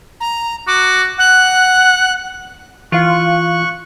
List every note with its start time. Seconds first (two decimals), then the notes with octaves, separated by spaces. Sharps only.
0.20 A#5
0.67 F#4 D6
1.19 F#5 F#6
2.92 E3 F4 F5 C#6 F#6